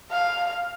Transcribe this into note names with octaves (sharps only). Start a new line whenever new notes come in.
F5